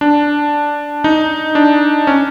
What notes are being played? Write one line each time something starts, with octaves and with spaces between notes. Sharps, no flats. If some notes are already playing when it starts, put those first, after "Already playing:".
D4
D#4
D4
C#4